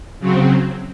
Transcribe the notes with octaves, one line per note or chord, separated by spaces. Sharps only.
C#3 F#3 C4